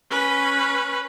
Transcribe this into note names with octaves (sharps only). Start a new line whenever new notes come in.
C#4 B4